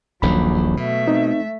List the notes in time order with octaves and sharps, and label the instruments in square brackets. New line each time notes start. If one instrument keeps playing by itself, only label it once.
[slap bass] D#1 A#1 D#2 [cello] F#3 [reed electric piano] B5
[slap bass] B2 [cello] A3 E5
[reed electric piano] C4 D#4